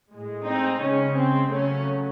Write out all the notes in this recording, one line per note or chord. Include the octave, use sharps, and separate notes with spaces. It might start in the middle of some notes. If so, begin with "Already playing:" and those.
A2 G#3
C4 D#4
C#3 G#3 C#4
C4
C#3 F#3 A3 C#4